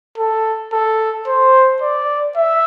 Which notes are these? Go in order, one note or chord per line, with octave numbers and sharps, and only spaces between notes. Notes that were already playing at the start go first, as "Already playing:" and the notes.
A4
A4
C5
D5
E5